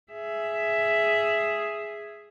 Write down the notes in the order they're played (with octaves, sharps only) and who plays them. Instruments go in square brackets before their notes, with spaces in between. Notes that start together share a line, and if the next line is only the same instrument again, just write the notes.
[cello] G#4 E5